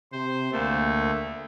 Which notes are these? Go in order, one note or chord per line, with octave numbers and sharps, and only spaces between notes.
C3 C5
D2 A3 A#3